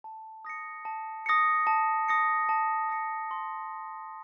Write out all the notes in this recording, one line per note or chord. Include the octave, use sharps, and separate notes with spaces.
A5
D#6 A#6 C#7
A5
D#6 A#6 C#7
A5
D#6 A#6 C#7
A5
D#6 A#6 C#7
C6